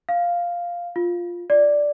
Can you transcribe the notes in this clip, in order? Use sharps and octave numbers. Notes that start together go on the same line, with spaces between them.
F5
F4
D5